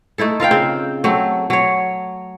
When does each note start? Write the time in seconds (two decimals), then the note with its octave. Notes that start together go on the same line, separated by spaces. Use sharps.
0.18 A3 D#4 E4 A4
0.40 F4 A#4 F5 G5
0.51 C#3 C4
1.04 F#3 A3 C4
1.50 F#3 C#5